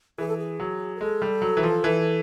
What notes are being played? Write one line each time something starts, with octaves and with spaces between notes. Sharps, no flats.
E3 G#4
A4
G#4
F#3
A#4
G#3 A4
G3
F#3
E3
F3
E3